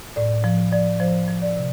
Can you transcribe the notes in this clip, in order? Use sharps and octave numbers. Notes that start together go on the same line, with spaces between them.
A2 D5
F3
F3 D5
F3 C5
F3
D5
C3